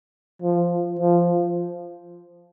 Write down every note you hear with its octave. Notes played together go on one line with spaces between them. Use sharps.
F3
F3